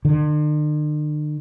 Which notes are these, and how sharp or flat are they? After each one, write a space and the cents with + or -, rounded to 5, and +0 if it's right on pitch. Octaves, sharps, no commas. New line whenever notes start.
D3 +45